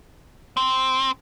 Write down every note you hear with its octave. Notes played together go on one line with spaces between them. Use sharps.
C4